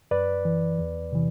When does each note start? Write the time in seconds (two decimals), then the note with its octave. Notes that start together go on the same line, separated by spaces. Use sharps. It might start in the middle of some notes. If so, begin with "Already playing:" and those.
0.11 F#2 B4 D5
0.45 E3
0.79 E2
1.12 C3 E3